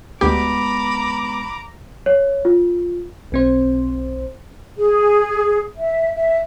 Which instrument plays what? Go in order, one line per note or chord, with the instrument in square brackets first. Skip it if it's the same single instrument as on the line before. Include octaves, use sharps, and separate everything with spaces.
[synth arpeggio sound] D2 G4 [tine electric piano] G#3 B3 [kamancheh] A#5 D6 [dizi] B5
[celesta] C#5
F4
[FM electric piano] B1 C4 C5
[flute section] G#4
E5
E5